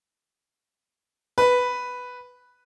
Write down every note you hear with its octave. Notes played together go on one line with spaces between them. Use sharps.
B4